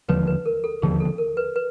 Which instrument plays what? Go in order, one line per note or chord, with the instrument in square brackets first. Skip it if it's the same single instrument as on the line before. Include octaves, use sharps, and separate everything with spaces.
[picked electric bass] E1 D#2 D3 F3 [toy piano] B4 C#5
[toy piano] B4
A#4
A4
[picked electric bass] E1 D#2 D3 F3 [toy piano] G#4
[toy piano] A4
A#4
B4
B4